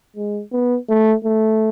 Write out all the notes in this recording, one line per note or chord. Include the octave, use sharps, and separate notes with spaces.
G#3
B3
A3
A3